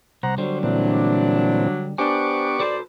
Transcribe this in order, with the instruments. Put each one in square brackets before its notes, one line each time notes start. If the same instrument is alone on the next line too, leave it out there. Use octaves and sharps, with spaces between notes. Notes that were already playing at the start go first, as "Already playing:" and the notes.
[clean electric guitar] C2 [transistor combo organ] C5 F#5 A#5
[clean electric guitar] D3 G3 [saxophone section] F#3 [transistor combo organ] C5
[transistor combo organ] A#2 E3 C4 [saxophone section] F#3 D4
[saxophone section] B3 D4 [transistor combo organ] G4 C#6 D6 [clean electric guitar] C5 G#5
[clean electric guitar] F#4 A4 B4 [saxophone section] C5 D5